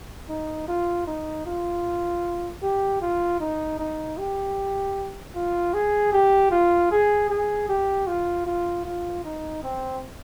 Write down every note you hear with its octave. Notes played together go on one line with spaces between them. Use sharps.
D#4
F4
D#4
F4
G4
F4
D#4
D#4
G4
F4
G#4
G4
F4
G#4
G#4
G4
F4
F4
F4
D#4
C4